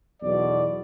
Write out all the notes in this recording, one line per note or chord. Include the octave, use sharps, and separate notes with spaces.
B1 E2 B2 D5